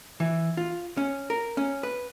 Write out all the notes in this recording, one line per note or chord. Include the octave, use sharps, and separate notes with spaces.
E3
F4
C#4
A#4
C#4
B4